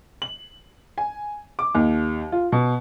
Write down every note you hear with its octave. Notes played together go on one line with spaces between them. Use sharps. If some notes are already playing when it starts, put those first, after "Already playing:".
F#7
G#5
D6
D#2
F4
B2